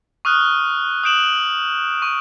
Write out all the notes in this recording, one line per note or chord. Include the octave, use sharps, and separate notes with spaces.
C#6 D#6 F6 F#6
D#6 G6 D7 E7 F#7
C#6